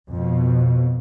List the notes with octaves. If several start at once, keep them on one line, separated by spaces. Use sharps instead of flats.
F2 B2